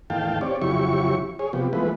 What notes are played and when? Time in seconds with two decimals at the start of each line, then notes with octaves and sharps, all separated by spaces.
0.10 E2 A2 D#3 F5 G5 A5
0.41 C4 G4 C#5 D5
0.62 F2 C#3 F#3 E4 G4 C#6
1.39 G#4 C#5
1.53 C3 F3 B3 G4
1.73 E3 F3 G#3 A3 B3 B4